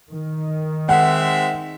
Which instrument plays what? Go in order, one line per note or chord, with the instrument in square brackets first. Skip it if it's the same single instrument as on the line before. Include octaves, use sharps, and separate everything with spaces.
[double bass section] D#3
[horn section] G#3 C4 E5 [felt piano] F#5